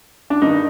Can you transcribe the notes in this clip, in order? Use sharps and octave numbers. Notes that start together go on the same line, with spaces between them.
D4
G2 D#3 D#4